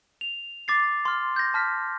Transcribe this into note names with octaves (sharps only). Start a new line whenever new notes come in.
F7
D6 A6 C7
C6 F6
G6 A#6
A5 F6 B6